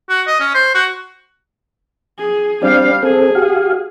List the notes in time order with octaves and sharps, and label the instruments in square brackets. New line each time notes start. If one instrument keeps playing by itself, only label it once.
[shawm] F#4
D#5
C#4
C5
F#4
[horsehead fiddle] G#4
[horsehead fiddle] G3 F5 [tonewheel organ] C4 D4
[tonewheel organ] C4 A4 [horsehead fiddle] G#4
[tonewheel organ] F#4 G4 F5